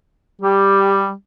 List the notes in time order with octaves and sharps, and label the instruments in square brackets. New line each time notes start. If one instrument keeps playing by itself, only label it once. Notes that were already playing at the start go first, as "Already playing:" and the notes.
[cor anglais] G3 [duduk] G4